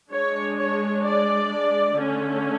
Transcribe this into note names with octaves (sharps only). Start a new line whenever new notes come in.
G#3 D4 C#5
C#5
D5
D3 A3 C#4